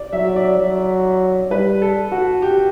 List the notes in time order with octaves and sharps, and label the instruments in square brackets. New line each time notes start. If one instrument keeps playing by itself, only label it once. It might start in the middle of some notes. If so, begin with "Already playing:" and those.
Already playing: [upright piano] D5
[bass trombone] F#3 [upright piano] E5
[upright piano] D5
[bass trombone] F#3
[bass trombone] G3 [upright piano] B4
[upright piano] A4
F#4
G4